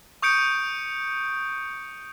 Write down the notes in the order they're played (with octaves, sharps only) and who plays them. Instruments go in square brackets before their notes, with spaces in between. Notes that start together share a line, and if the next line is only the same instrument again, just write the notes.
[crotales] C#6 D#6 G6 C#7 D7